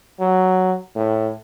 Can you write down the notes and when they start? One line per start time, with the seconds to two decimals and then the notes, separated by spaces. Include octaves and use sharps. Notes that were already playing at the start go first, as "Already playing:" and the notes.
0.20 F#3
0.96 A2